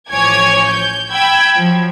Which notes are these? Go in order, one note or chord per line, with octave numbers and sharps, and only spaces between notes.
A1 F3 C#5 G#5 D6 G#6
G6
G5 B5 E6 G#6
F3 F#3